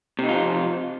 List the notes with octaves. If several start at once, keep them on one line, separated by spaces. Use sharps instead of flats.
C3 F3 D#4 F4